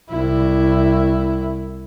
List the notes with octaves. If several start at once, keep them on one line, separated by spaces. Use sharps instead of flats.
C2 E4